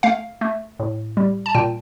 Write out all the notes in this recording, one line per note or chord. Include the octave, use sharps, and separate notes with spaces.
A3 F5
A3
A2
G3
A5
A#2 G5